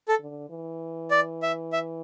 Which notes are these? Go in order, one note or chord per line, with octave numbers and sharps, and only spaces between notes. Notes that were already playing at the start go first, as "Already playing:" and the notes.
A4
D3
E3
D5
E5
E5